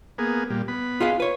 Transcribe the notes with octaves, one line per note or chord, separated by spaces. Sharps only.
A#3 B3 G#4
A#2 G3
B3 B5
F4 G#4 F5
B4 C#5